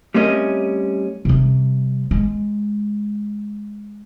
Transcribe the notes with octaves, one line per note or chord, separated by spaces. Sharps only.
G3 A3 C4 C#4 A#4 D#5
C3 G3
G#3